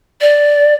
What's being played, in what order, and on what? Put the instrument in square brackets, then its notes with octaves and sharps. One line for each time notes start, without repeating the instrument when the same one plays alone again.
[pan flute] D5